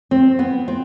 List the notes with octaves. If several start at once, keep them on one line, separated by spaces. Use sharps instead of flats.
C4
B3
C4